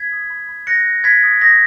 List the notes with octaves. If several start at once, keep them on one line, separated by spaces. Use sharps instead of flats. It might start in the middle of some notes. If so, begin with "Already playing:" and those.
Already playing: G#6 B6
D#6
B5
B5
F#6 A#6 C#7
F#6
B5 G#6 B6
D#6
D#6 A#6